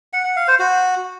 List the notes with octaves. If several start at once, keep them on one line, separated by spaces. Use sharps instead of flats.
F#5
F#5
F5
C5
F#4